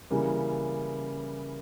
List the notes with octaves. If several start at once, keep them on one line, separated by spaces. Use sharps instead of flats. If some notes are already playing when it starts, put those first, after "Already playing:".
C#3 E3 G3 A#3